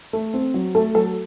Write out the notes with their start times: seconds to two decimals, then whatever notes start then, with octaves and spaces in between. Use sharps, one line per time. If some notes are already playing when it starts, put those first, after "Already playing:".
0.13 A3
0.34 C4
0.54 F#3
0.75 A3 A4
0.95 F#3 A4